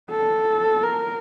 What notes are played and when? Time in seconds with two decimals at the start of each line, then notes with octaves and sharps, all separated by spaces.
0.11 A4
0.83 A#4